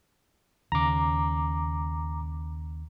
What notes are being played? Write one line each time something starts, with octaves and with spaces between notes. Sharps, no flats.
D#2 C#3 A#5 D6